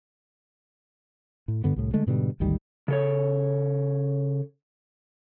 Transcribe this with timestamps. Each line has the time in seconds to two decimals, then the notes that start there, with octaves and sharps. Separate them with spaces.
1.48 A2
1.64 G2 D3 B3
1.76 C2 A2
1.94 D3 G#3 A3
2.06 G#2 B2 D3 G3
2.40 G#1 D2 D#3 G3
2.88 C#3 A4 C#5